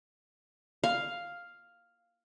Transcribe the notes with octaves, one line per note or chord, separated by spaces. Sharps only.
F5